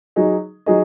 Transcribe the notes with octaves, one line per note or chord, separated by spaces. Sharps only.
F#3 D#4 G#4 D#5
F#3 D#4 G#4 D#5